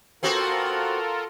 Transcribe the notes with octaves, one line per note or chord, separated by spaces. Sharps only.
B3 C4 F4 F#4 A4 A#4